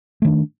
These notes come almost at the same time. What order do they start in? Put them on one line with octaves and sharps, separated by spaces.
A3 D#3 D4